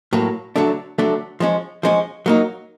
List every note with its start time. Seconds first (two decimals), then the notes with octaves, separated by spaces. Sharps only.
0.13 A2 F#3 A#3
0.56 D3 F#3 A3 D4
0.98 D3 F#3 A3 D4
1.40 F3 G#3 C#4
1.83 F3 G#3 C#4
2.26 F#3 A#3 D#4